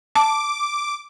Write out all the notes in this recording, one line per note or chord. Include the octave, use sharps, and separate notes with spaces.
A5 D6